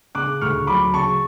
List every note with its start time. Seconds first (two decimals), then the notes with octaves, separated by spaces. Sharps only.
0.15 C#3 D6 F#6
0.41 D2 C#6 F6
0.67 F#3 B5 D6
0.94 C#3 A5 C#6